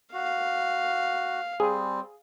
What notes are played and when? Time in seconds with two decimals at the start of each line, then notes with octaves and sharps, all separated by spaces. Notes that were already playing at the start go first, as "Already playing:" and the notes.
0.13 F#4 F5
1.60 G3 C4 G#4